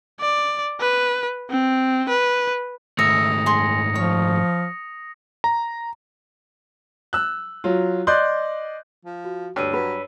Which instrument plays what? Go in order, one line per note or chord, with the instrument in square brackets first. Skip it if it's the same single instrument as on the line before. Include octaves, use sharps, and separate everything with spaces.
[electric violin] D5
B4
C4
B4
[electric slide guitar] G#2 D#3 A3 [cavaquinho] E5 [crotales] D#6 A#6 C#7
[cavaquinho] G#4 C6
[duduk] F3 [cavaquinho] C#5
[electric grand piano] A#5
[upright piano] E6 F#6
F#3 F4
D5 D#5 C6 F#6 G6
[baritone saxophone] F3
[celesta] F#4
[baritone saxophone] D2 [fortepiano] G2 [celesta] C#5 E6 D#7
[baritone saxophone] F#3 [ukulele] B4